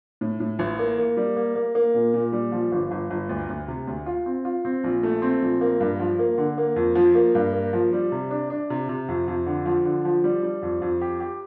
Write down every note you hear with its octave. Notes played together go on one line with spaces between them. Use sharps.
A2
A2
A1
A#3
A#3
G3
A#3
A#3
A#3
A#2
A#2
G3
F3
G1
G1
G1
D2
D2
C3
D2
F4
C4
F4
C4
A#1
A3
C4
A#1
A#3
G2
F3
A#3
D3
A#3
F2
F3
A#3
G2
A#3
F3
G3
C3
D4
D4
C3
C3
F2
F2
D3
F3
D3
F3
G3
G3
F2
F2
G4
G4